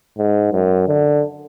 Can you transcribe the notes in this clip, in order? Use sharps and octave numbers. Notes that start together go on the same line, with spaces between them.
G#2
F#2
D3